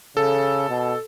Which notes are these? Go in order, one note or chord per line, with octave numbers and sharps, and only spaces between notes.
C#3 A4
B2